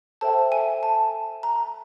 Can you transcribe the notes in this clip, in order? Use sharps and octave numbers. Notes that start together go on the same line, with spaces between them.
A4 C5 E5 G5 A5
G#5
A5
A#5